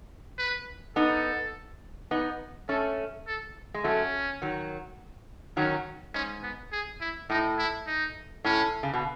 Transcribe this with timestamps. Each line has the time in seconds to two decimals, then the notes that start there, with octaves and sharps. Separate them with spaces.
0.38 B4
0.96 B3 D#4 A4
2.11 B3 D#4
2.69 A3 C#4 A4
3.27 A4
3.74 G#3
3.84 F#3 A3 C#4
4.42 D#3 F#3
5.57 D#3 F#3 C#4
6.14 G#2 C#4
6.43 B3
6.72 G#4
7.01 E4
7.30 A2 D#4
7.59 E4
7.87 D#4
8.44 A2 C#4
8.83 C#3
8.94 B2